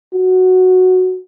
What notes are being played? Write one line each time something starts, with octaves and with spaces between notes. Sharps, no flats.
F#4